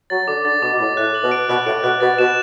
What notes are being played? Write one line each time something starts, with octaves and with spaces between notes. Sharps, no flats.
F#3 A6
D3 D6
D3 A6
B2 D6
B2
A2 A6
A2 F#6
F#7
B2
D7
B2 F#6
A2 D7
B2 F#6
B2 A6
B2 E7